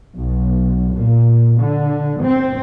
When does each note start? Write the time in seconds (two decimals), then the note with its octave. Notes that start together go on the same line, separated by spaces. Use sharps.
0.16 B1
0.95 A#2
1.59 D3
2.22 C4